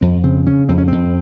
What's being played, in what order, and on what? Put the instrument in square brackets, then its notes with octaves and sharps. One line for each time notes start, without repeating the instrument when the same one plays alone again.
[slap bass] F2 C4
C#3 C4
C#3 C#4
F2 C4
C#4
F2 C4